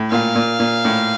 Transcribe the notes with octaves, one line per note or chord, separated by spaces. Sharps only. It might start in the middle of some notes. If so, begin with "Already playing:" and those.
Already playing: A2
A#2 F5
A#2
A#2
A2